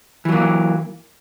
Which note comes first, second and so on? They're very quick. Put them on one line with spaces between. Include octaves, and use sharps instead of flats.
E3 F#3 A#3